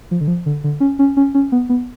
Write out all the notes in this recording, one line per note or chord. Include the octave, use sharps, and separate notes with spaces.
F3
D3
F3
D3
D3
C#4
C#4
C#4
C#4
B3
B3